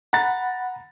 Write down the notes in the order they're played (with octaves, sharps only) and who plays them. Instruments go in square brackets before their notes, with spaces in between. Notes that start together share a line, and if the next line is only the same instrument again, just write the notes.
[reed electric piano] F#5 B5 [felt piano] A#5 A6